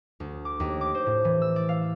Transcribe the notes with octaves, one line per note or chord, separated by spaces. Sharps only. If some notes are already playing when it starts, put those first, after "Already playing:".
D2
D6
D#2
D6
C5
A2
E3
E6
D5
F5